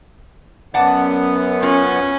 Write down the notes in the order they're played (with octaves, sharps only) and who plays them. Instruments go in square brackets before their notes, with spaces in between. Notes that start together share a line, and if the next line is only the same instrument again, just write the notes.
[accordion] F#2 B3 [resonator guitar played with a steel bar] D5 F#5 A5
[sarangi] C#4 [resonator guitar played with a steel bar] F4